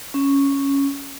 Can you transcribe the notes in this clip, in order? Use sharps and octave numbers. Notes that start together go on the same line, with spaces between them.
C#4